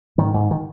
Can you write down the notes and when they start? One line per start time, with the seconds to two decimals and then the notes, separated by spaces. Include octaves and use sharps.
0.18 G#2 D#3
0.34 G#2
0.51 D#3